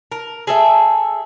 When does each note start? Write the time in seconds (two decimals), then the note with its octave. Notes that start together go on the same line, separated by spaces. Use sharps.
0.12 A#4
0.47 G#4 A4 E5